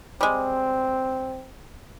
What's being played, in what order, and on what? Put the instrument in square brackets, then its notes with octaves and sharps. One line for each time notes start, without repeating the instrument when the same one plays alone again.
[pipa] G3 G#3 [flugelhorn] C4